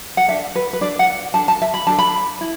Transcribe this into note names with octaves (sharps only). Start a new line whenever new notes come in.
F#5
D4 A4 E5
B4
B4
D4 A4 D5
F#5
D4 A4 A5
A5
E5
B5
D4 A4 A5
B5
E4